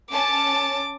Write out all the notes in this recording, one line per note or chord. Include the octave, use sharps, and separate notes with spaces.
C#4 A5 D6